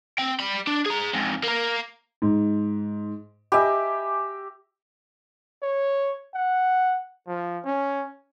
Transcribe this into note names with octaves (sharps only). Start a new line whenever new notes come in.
C4 G5
G3 B5
D4
G#4 A#5
F2 G#2
A#3 A#4
G#2
G4 D#5 E5 G#5 B5
C#5
F#5
F3
C#4